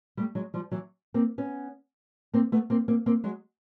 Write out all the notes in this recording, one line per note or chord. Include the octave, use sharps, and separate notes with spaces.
G3 A3
F#3 G#3
F3 G3
E3 F#3
A#3 C4
B3 C#4
A#3 C4
A3 B3
A#3 C4
A#3 C4
A#3 C4
F#3 G#3